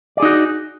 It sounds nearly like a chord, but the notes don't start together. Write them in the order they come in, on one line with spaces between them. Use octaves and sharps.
D5 G#4 D#4 F#4